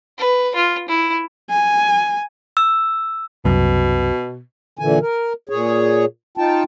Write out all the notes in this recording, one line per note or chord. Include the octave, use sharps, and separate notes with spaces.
B4
F4
E4
G#5
E6
C2 F#2 B2
A#2 D3 E3 G#5
A#4
A#2 G#4 C#5
D#4 F4 G5 A5